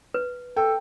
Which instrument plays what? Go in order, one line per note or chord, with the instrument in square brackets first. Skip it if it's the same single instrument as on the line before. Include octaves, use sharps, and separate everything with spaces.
[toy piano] B4
[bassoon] A4 [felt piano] G5